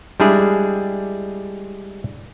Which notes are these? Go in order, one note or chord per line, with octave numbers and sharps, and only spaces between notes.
G3 G#3 D4 E4 G#4